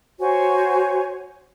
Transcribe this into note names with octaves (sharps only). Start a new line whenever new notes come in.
F#4 C5 C#5 G#5